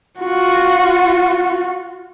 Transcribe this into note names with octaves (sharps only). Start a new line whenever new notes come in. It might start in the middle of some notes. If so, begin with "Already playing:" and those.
F4 F#4